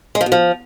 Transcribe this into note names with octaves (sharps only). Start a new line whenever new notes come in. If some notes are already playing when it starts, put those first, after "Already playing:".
G#3
F3
B2
F3